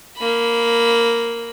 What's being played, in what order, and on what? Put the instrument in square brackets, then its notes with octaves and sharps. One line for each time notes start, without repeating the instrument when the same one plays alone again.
[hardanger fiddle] A#3 B5